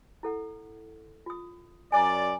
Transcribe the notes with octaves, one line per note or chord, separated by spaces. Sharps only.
E4 A4 F#5
F4 D#6
F#2 D5 G#5 A#5